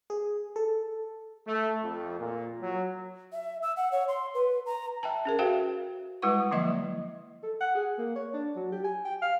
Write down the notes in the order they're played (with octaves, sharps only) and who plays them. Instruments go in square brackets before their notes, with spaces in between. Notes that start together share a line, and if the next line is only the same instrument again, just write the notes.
[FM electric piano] G#4
A4
[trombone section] A3
F2
A#2
F#3
[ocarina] E5
E6
F#5
C#5
C6
B4
A#5
[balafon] E5 G5 A5
C#4 G#4 A#4
F#4 A4 C5 E5 F5 G5
G3 G#3 E4 B4 F#5 C#6
D3 F3 F#3 A#3 D#5 E5
[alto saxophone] A4
F#5
G#4
A#3
C#5
D4
F#3
G4
G#5
G5
F5